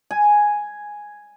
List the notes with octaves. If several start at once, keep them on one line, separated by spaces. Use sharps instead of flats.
G#5